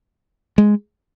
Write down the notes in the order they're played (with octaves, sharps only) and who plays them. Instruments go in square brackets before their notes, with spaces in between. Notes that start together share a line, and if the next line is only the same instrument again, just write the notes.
[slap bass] G#3